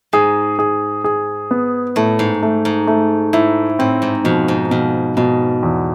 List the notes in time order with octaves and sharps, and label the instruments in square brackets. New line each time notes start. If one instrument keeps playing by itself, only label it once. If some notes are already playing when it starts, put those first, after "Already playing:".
[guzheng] G#2 [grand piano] G#4
[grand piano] G#4
G#4
B3
[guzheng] A2 [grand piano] A3
[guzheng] G#2
[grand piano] A3
[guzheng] G#2
[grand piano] A3
[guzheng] G#2 [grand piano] E4
[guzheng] A2 [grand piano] C4
[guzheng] G#2
[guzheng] F2 [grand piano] B2
[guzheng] G#2
[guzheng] F2 [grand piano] B2
[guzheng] G#2 [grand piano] B2
[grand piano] E2